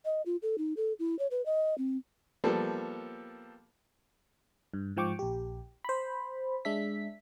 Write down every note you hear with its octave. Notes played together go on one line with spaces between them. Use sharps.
D#5
F4
A4
D#4
A4
E4
C#5
B4
D#5
C4
F3 G3 A#3 B3 A4
G2
G#2 F3 G5 C#6 D6
A#1 G4
C5 B5
G#3 D4 E5 B6